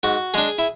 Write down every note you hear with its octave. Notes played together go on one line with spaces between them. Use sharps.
G#2 F#4
G#3 D4 G#4
E4